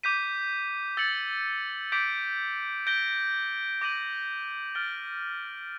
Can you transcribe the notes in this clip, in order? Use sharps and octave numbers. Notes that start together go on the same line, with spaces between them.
D6 G6 B6 D#7
E6 A6 C#7 F#7
D6 G6 B6 D7
G6 A#6 D7 G7
D6 G6 A#6 D#7 F#7
F6 A6 D7 G7